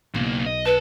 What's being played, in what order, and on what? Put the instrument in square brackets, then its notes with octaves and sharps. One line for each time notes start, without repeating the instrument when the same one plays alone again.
[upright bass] B1 [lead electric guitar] C#3 A#3
[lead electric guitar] D#5
[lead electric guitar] A#4 A5 [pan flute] B4